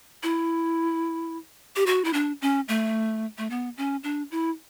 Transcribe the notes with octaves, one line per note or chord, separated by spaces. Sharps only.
E4
G4
F#4
E4
D4
C#4
A3
A3
B3
C#4
D4
E4